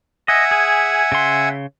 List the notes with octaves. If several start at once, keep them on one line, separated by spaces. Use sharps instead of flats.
D#5 E5 F#5 G#5
G#4
C#3 C6